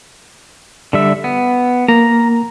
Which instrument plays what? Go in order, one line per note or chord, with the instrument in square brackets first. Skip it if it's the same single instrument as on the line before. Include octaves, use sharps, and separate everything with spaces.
[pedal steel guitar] D3 G3 E5
B3
[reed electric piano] A#3 [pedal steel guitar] A#5